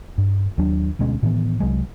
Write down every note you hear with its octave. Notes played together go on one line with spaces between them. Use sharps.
G2
D#2 F#3 D4
D2 B2 G#3 C#4
A2 D#3 E3 B3
C2 F#3 G#3